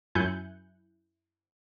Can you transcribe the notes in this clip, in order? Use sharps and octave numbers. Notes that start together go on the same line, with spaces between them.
F#2 E4 G#5 F#6 G6 C#7